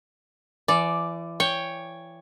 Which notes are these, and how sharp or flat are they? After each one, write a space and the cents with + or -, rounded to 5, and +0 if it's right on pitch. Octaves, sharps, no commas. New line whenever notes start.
E3 +35 D5 +0
C#5 +0 G5 +10